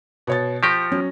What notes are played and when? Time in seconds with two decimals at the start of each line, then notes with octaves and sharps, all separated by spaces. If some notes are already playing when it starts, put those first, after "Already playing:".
0.27 B2 C#5 A6
0.63 F3 G4 C#6 A#6
0.91 F#3 C#4